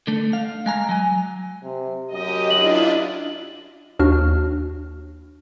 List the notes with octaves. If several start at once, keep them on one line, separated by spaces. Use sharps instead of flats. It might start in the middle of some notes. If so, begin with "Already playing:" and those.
D3 A3
F5
G#3 G#5 A#5
F#3 G#5
C3
F#2 G4 D#5
D4 E4 F4 F#7
D#2 D4 F#4 F6